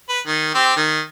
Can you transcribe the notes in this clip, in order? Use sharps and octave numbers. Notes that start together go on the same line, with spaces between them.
B4
D#3
C4 G4
D#3